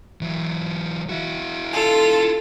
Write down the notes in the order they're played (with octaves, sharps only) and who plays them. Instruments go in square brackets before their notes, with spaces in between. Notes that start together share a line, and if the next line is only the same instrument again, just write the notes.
[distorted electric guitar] E3 F#3
E4 F#4
[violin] F4 A4